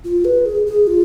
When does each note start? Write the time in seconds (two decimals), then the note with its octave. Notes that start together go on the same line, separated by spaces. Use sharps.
0.05 F4
0.25 B4
0.46 G#4
0.66 G#4
0.87 F4